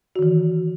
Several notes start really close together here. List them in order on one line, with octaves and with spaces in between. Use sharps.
F#4 D#3 E3